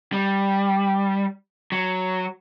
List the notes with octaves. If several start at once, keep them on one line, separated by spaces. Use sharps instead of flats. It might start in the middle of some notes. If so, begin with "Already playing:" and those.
G3
F#3